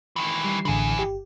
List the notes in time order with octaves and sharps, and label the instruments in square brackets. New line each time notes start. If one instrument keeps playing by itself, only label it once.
[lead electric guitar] D#3 E3
[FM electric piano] G3 C7
[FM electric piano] A1 D3 [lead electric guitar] E3 G#4
[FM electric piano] G1 G4